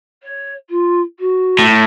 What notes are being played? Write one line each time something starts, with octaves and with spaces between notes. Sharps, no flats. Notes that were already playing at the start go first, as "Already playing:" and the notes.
C#5
F4
F#4
A2